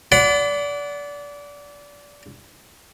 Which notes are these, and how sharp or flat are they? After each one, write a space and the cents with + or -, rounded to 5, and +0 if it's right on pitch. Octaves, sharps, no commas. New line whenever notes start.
D5 -25 F#5 +0 B5 +35